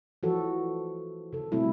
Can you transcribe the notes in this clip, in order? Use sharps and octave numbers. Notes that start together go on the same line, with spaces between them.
E3 F3 F#4 A4
C#3 A4
B2 G3 A3 C4 E4